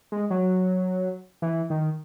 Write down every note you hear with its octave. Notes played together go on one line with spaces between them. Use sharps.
G#3
F#3
E3
D#3